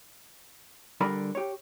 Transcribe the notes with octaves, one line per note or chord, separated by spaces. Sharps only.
D3 G3 A#4 D5 B5
G4 C#5